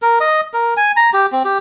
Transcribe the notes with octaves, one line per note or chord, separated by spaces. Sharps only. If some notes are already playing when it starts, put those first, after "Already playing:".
A#4
D#5
A#4
G#5
A#5
G4
C4
G4